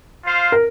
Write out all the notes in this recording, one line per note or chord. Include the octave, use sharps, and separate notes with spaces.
F4 C5 F5
A#4